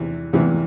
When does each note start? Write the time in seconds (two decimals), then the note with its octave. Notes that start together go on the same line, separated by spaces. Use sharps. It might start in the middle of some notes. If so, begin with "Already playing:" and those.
Already playing: E2 C3 E3
0.33 E2 C3 E3